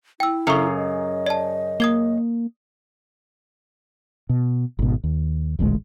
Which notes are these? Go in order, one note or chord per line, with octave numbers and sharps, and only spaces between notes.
E4 G5 E6
F#2 C#3 A4 C#6
D#5
D5 A5
A#3 D#6 G#6 G7
B2
G#1 B2
D#2
D#1 A1 D2 G#3